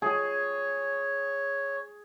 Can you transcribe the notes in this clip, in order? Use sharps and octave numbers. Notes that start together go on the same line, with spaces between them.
G#4 C#5